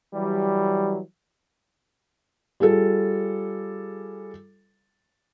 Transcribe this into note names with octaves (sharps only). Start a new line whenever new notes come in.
E3 F#3 G3
G3 F4 G#4 A4